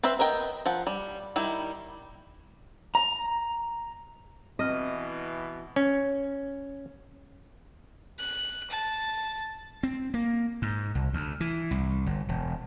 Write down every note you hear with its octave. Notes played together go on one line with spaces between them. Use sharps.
C4 B4 C5 E5
B3 A#4 D#5 G5
F3 F#5
G3
D#3 G3 E4
A#5
B2 E3 C4 D#5 F6
C#4
F#6
A5
C4
A#3
G#2
C2
D2
E3
C2
G1
E1